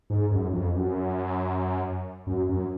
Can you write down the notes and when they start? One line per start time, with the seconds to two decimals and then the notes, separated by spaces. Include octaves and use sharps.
0.10 G#2
0.31 F#2
0.53 F2
0.75 F#2
2.27 F#2
2.49 F#2